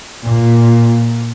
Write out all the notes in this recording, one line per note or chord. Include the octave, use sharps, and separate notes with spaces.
A#2